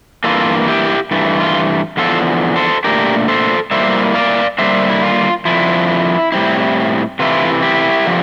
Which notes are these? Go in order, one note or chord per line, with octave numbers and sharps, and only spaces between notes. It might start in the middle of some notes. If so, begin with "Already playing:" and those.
G2 E3 A#3 F4 A4
E4 G4
G2 E3 A3
F4
E2 D3 F3 F4 A4
A4 C5
A#2 A3 D4 G4 A#4
A4 C5
A2 G3 A#3 E4 C5 E5
D5 F5
D3 G3 A#3 C5 E5
E4
F4
F2 D3 F3 E4
A2 G3 C4 E4
C3 E3 A3 E4 F4
E4 G4
D3 F3